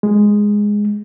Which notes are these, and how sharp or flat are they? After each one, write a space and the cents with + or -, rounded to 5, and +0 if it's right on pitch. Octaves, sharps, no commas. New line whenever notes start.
G#3 -5